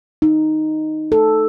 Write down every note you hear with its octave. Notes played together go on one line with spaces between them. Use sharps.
D#4
A4